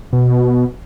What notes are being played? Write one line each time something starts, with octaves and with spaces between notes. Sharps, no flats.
B2